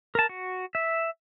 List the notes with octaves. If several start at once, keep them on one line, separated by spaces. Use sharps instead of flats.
A#4 A5
F#4
E5